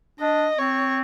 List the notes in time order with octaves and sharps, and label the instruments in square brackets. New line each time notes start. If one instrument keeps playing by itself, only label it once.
[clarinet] D4 [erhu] D#5
[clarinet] C4 [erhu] C#5